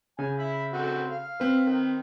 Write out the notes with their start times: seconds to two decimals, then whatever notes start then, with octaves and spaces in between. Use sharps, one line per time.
0.19 C#3 G#5
0.39 E5 B5
0.73 A3 C4 F#4
1.10 F5
1.40 C4 B4
1.66 D#3